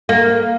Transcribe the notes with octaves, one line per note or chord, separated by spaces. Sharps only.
A#3